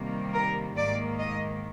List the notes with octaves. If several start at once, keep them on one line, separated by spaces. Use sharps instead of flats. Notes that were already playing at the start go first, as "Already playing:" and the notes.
Already playing: C3 D#3 G3 A#3
A#4
G#2 D#3 A#3 D5
D#5